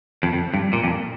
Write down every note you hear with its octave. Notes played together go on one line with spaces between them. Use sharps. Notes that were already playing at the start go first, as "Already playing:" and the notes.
F2
F2
G2
A#2
F2